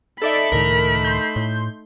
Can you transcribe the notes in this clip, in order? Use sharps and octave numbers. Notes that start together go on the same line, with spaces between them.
D#4 A4 D5 E5 B5
C#2 A2 D#3 A3 D#4 A#4
C6 G6
A2